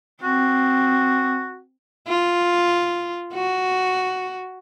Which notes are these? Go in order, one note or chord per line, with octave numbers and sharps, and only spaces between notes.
C4 F#4
F4
F#4